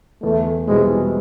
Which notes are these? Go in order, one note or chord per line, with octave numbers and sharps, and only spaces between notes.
E2 A3
B2 G3 G#3 C4 E4